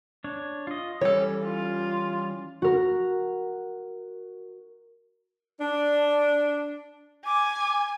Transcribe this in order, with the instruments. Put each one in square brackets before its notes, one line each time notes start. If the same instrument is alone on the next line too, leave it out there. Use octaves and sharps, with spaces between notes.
[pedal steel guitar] D4 C#5
F4 D#5
[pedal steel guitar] E3 G3 C#4 [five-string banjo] A4 C#5
[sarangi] F4
[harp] F#4 A#4
[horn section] D4
[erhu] G#5 [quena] D6